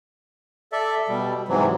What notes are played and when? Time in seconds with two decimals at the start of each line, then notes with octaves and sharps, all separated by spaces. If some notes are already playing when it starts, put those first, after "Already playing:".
0.72 A4 D5 E5
1.09 B2 G3
1.48 G#2 C3 E3 F#3